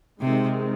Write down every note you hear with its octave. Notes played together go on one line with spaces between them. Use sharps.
C3 D#3 G#3 C4